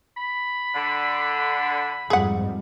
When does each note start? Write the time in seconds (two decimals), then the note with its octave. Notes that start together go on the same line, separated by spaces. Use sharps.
0.17 B5
0.74 D3
2.10 F2 G#2 G3 G#4 F#5